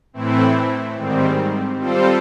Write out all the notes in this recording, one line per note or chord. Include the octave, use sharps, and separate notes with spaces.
A2 E3 A3 C4 E4
G#2 D#3 G3 C4
G3 C4 F4 A4 C5